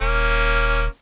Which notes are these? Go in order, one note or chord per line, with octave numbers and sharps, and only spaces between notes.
D#1 A#3 C#4